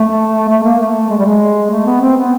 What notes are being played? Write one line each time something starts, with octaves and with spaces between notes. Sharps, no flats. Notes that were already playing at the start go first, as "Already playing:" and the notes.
Already playing: A3
A3
A#3
A3
G#3
G3
G#3
A3
B3
C4
B3